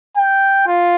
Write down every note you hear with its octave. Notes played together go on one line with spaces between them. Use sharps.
G5
F4